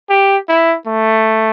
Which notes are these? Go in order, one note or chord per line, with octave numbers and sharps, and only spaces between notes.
G4
E4
A3